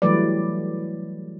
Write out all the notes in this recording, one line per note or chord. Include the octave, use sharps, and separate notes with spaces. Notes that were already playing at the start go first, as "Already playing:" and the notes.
E3 F#3 G3 A3 B4 D5